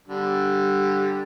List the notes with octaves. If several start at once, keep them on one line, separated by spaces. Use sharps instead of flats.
D3 G3